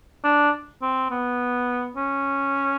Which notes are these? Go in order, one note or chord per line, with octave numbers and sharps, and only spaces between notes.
D4
C4
B3
C#4